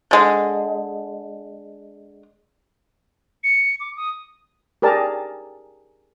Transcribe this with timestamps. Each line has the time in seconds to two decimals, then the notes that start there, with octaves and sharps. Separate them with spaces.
0.11 D3 G#3
3.44 C#7
3.80 D6
3.97 D#6
4.82 G4 G#4 A#4 D5 A5